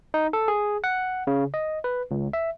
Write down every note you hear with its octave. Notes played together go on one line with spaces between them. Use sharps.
D#4
A4
G#4
F#5
C#3
D#5
B4
C#2
E5